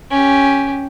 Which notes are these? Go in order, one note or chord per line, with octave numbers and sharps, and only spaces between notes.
C#4 G4